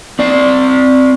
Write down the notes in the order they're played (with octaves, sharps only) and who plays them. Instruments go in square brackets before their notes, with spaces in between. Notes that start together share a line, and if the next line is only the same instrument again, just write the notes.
[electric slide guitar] C4 D5